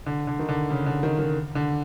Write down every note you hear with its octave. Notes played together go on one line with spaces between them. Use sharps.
D3
D3
D#3
D3
C#3
D3
D#3
D#3
D3